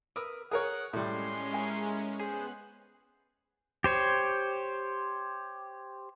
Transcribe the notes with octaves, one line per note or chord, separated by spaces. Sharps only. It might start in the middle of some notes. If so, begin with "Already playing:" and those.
A#4 B4 D#6 E6
G#4 A#4 C#5 F#5 D#6
A2 G3 G#3 C#4 C6
E4 A#4 G#5
B3 G#4 C5 F#6
G4 C5 C#5